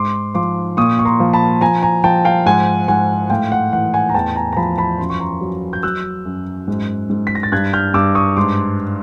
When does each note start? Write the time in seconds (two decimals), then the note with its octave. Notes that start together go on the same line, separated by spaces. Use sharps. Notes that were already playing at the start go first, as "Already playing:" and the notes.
Already playing: G#2 C6 D6
0.34 F3 C6 D6
0.77 A#2 C#6 D#6
0.99 C#6
1.05 A#5 C6
1.20 F3
1.33 A5 B5
1.61 F3 G#5 A#5
1.82 G#5 A#5
2.04 F3 G5 A5
2.25 F5 G5
2.46 G#2 F#5 G#5
2.88 G#2 F#5 G#5
3.30 A2 F5 G5
3.52 F#5
3.73 E3 F#5
3.94 F#5 G#5
4.09 A#5
4.14 E2 G5 A5
4.36 G#5 A#5
4.53 A#5
4.57 F3 A5 B5
4.78 A5 B5
4.99 F#2 C6
5.10 C#6
5.20 A#5 C6
5.41 F#3
5.73 G6
5.83 F#3 E6 F#6
6.25 F#2
6.68 G#2
7.10 G#2
7.27 B6
7.35 A#6
7.43 A6
7.52 G2 F#6 G#6
7.73 F6 G6
7.94 G2 D6 E6
8.15 C#6 D#6
8.36 G#2 C6 D6